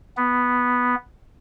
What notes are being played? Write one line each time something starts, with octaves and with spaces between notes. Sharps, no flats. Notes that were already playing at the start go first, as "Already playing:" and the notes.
B3